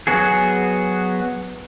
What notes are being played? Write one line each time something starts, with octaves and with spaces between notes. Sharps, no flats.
F#3 B3 F#4 G#4